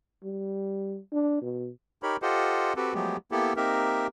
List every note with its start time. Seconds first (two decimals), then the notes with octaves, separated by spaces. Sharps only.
0.24 G3
1.12 D4
1.42 B2
2.03 D#4 G4 A#4 C#5 B5
2.22 F4 G4 A4 C5 D#5 F#5
2.76 C4 F#4 G4 A4 B4
2.94 F3 F#3 G#3 A3 B3 G4
3.32 A#3 B3 E4 G4 A4
3.56 A#3 C4 D#4 G4 A#4 E5